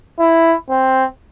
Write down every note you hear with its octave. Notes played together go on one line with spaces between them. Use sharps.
E4
C4